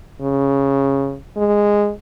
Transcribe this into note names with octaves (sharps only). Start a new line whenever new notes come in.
C#3
G#3